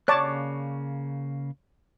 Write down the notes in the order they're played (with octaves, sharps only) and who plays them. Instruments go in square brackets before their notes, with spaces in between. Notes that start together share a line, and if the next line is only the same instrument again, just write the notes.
[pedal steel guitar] C#3 A#3 F#6 [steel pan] C#5 D5 A5